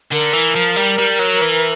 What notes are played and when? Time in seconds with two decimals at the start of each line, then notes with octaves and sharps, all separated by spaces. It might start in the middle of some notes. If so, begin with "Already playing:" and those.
0.12 D3 A#4
0.33 E3
0.55 F3
0.76 G3
0.98 G3
1.19 F#3
1.41 E3